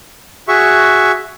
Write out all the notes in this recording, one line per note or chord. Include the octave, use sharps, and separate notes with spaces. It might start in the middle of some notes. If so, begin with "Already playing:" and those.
F#4 G#4 E5 C#6